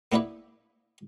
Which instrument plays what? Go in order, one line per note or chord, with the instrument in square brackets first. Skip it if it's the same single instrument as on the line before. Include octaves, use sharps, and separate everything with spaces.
[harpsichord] A#3 B3 D4 E4 B4